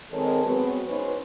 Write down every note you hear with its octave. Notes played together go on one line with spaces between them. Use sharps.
D#3 G#3 C4 A4 A#4 C#5
F#3 G#3 B3 C4 F#4 B4
C#4 D#4 B4 C5